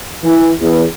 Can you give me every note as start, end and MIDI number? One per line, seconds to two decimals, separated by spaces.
0.23 0.51 52
0.61 0.83 40